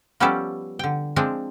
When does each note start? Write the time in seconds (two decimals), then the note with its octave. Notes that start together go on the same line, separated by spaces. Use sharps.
0.20 F3 G3 B3 C#4 G4 A4
0.79 D3 G5
1.16 F3 G#3 C4 D4